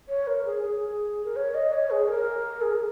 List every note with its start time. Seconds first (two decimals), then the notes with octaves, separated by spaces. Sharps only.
0.09 C#5
0.27 A#4
0.45 G#4
0.63 G#4
1.25 A#4
1.36 C#5
1.55 D#5
1.73 C#5
1.91 G#4
2.09 A#4
2.62 G#4
2.71 A#4